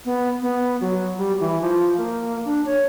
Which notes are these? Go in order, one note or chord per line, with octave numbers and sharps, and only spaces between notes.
B3
B3
F#3
G3
E3
F3
A#3
D4
C#5